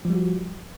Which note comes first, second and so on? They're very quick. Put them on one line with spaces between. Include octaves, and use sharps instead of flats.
F3 G3 F#4